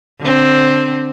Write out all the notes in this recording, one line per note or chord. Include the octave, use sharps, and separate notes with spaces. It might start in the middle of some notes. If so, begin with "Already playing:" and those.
D3 C4